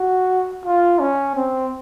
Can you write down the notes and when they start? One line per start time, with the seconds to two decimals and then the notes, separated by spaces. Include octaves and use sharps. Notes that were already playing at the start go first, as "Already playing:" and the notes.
Already playing: F#4
0.65 F4
1.00 C#4
1.36 C4